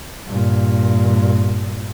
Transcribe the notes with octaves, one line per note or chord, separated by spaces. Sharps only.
G2 A#2